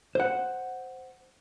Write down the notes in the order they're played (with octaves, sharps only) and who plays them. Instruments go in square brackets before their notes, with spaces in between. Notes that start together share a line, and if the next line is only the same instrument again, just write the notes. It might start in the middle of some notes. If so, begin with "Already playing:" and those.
[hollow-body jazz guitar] C5 F#5